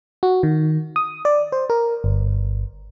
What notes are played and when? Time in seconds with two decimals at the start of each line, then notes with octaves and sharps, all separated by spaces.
0.23 F#4
0.43 D#3
0.96 D#6
1.25 D5
1.52 C5
1.70 A#4
2.04 G1